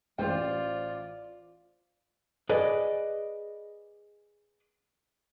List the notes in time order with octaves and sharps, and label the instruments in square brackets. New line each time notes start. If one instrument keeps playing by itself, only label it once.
[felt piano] A1 [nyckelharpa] F4 D5 [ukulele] C5 G5
[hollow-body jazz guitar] G#4 B4 D5 D#5